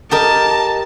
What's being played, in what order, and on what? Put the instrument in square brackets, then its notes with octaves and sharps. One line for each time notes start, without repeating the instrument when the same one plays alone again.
[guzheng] G4 A#4 D#5 [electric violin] A5